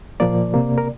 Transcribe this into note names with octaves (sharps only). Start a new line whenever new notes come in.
A#2 F3 A#3 D5
C3 A#3
A#4